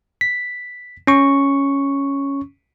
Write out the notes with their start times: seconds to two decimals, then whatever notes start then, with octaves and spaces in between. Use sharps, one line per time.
0.21 B6
1.07 C#4 C#6